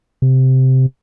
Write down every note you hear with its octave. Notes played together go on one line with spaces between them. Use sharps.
C3